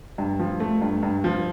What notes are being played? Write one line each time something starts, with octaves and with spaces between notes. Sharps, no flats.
G2
F3
A3
G2
G2
F3